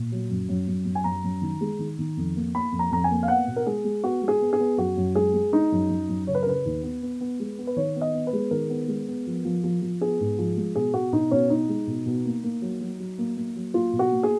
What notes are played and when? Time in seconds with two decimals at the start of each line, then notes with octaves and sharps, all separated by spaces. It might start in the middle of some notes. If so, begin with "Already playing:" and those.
Already playing: A#2
0.12 F#3
0.30 F#2
0.49 F#2
0.68 F#2
0.86 F#2
0.95 G#5
1.04 F#2 A#5
1.24 F#2
1.42 D#3
1.61 G#3
1.79 D#3
1.99 D#3
2.17 F2
2.36 A#3
2.54 A#3 B5
2.72 F2
2.79 A#5
2.91 F2 A#5
3.04 G#5
3.11 A#3
3.23 F5
3.28 B3 F#5
3.47 B2
3.56 A#4
3.66 G#3 G#4
3.84 G#3
4.04 B3 F#4
4.22 G#3
4.28 G#4
4.41 B3
4.53 G#4
4.60 B3
4.78 F#2 F#4
4.97 F#2
5.15 G#3 G#4
5.34 G#3
5.52 G#3 D#4
5.72 F#2
5.90 F#2
6.09 F#2
6.27 C#3 C#5
6.35 B4
6.43 A#4
6.46 C#3 B4
6.65 D#2
6.83 B3
7.03 B3
7.21 B3
7.40 G#3
7.58 B3
7.67 B4
7.77 D#3 C#5
7.96 B3
8.01 D#5
8.14 B3
8.27 B4
8.33 G#3
8.51 D#3 A#4
8.70 B3
8.88 G#3
9.08 B3
9.27 F3
9.45 F3
9.64 F3
9.82 F3
10.01 B3 G#4
10.20 G#2
10.38 F3
10.57 G#3
10.76 B2 G#4
10.94 B2 F#4
11.13 B2 D#4
11.31 B2 C#4
11.50 B2 D#4
11.69 G#3
11.87 B2
12.06 B2
12.25 A#3
12.44 A#3
12.62 F#3
12.81 F#3
12.99 F#3
13.18 A#3
13.37 A#3
13.56 F#3
13.74 A#3 F4
13.93 B2
13.99 F#4
14.12 A#3
14.23 G#4